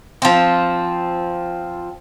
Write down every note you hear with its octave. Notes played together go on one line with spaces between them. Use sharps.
F3 C4